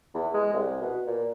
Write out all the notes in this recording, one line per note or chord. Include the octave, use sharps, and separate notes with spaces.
E2
G#3
C2
B2
A#2